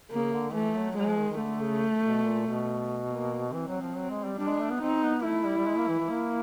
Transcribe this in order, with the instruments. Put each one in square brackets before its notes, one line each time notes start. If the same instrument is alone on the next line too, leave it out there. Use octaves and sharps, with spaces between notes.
[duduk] C#3 [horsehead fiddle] A#3
[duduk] D3
[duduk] E3 [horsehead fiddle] A3
[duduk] F#3
[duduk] F#3 [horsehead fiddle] G#3
[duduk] F3
D#3
D#3
[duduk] D3 [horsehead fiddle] A3
[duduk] C#3
B2
A#2
B2
[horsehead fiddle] A#3
[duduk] E3 [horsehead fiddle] C4
[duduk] F#3
F3
F#3
G#3
G3
[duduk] G3 [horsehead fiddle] D4
[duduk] G#3
A3
B3
[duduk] C4 [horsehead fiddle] D#4
[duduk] B3
[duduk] A3 [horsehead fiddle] E4
[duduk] G3
G3
G#3
A#3
E3
E3
A#3